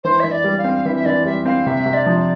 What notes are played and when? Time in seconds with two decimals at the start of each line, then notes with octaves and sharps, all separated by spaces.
0.04 E3 C5
0.20 E3 E5
0.31 D5
0.44 G3
0.58 F5
0.64 C4
0.85 E3 E5
0.96 E5
1.05 E3 D5
1.25 G3 E5
1.45 C4 F5
1.66 C3 E5
1.86 C3
1.93 D5
2.06 F3
2.19 D5